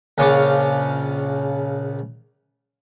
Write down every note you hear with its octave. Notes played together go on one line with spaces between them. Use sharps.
A#1 C#3 F4 C#6 D6